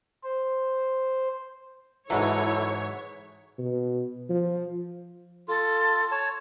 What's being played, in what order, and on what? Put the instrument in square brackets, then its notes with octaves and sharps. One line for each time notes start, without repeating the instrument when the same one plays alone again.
[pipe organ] C5
[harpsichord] G#2 E3 [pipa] F#3 G#3 [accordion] E4 A4 [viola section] C#5
[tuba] B2
F3
[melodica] F4 [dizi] A4
[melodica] C#5 A5